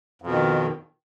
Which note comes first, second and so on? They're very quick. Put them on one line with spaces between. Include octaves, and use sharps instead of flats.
F2 B2 D#3